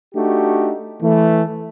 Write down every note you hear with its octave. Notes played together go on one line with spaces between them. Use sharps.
A3 D4 D#4 F#4 G4
E3 A3